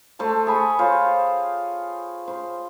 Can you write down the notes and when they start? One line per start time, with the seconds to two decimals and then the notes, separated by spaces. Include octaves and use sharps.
0.19 A3 C5 A5
0.47 G#4 B5 C#6
0.79 F4 C5 C#5
2.28 C5